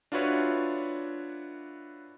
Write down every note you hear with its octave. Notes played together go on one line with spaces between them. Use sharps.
D4 F4 F#4 B4 C#5 E5